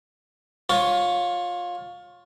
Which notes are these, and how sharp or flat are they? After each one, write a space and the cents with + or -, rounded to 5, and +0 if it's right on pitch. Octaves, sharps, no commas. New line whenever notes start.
F4 +20 C#5 +0